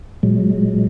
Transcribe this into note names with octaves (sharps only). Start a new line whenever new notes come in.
A#2 F#3 G#3